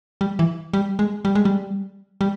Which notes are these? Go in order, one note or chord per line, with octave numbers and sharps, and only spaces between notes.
G3
E3
G3
G#3
G3
G#3
G3
G3